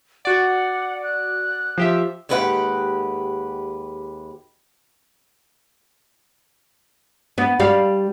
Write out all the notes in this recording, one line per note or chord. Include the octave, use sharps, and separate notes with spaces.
F#4 D5 F#5
F#6
F3 G4 E5
D#2 G#3 G4 B4 C5 F#5
B3
G3 F5